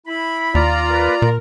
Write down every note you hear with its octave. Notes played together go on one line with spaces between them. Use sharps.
E4 B5
D#2 F4 D5 A#5
A#3 A#4 B4
A#2 A#4